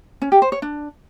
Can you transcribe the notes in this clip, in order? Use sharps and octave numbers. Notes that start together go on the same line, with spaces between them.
C#4
G4
C5
C#5
D4